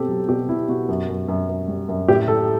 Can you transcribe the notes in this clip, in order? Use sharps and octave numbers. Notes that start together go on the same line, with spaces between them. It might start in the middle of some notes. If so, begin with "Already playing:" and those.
Already playing: B2 C4 G4 A4
F#3
B2 G4
B2 E4
B2 F#4
F#2
F#2
F#2
F#2
G3
F#2
A2 G4
A2 A4